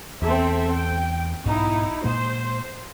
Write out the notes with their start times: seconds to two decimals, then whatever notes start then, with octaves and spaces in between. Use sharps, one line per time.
0.22 E2 C4 A4 E5
0.73 G5
1.46 B1 G#2 B2 D#4 E4
2.04 A#2 G#3 A#3 C5